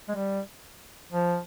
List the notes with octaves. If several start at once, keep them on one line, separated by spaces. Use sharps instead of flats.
G#3
G3
F3